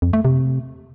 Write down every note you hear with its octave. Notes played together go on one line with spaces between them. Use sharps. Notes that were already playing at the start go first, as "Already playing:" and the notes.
F2
A3
C3